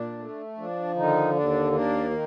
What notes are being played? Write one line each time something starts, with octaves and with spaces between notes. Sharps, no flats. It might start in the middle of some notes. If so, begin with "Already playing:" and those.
Already playing: A#2 D4
A3
F3 D4
D3 D#3 D#4
D#2 D4
A#3 D4
D#3